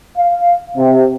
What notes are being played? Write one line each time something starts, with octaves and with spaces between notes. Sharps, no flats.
F5
C3